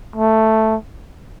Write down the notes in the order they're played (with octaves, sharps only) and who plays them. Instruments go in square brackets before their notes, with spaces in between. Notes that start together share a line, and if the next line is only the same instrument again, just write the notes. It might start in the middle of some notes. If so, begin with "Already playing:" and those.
[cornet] A3